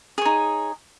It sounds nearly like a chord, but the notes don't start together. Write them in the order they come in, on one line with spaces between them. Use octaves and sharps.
G#4 C#5 D#4